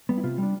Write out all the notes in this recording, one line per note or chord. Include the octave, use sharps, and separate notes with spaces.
G3 B3
E4
C3 F4
G3 D4